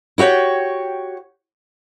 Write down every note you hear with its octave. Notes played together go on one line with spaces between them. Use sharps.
E4 F#4 G4 C#5 G5